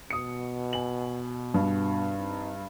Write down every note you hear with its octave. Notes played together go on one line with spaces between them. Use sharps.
B2 D#6 C#7
G#5 F#7
G2
C4 D#4